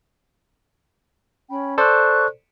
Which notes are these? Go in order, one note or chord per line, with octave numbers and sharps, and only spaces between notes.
C#4 G5 B5
A4 C5 D5 C#6 F#6